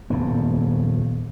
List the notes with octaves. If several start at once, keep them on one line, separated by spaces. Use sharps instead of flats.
D#1 F2 C#3 B3